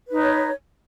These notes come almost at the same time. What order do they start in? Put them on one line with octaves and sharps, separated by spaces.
B4 D#4 C#5